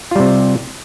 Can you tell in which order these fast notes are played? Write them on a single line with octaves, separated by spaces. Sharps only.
F4 G3 C3